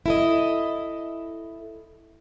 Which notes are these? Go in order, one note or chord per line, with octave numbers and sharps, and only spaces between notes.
E4 A4 D#5